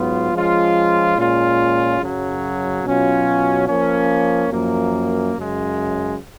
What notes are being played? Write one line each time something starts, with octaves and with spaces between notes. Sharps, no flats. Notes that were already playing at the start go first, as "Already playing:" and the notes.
Already playing: G#2 F#3 B3 F4
F3 G#3 C#4 F4
A#2 G#3 C#4 F4
F#2 C#3 F#3
B2 F#3 C#4 F4
F3 A#3 C#4
F#2 F3 A#3
F#2 C#3 G#3